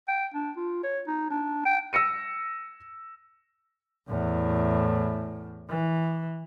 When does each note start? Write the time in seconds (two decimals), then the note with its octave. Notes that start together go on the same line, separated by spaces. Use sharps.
0.08 G5
0.34 D4
0.57 F4
0.83 C#5
1.07 D#4
1.30 D4
1.65 G5
1.93 E6 A#6 C#7 D#7
4.08 E2 A2
5.69 E3